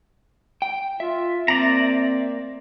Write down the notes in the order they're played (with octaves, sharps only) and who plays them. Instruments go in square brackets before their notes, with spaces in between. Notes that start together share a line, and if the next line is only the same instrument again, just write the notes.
[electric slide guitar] G5
[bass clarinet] F4 [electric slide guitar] E5
[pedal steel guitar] A#3 D5 A#5 [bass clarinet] C4